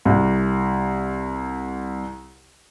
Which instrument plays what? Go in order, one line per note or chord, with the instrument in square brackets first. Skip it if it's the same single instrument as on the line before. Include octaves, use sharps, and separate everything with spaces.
[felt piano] C2 G4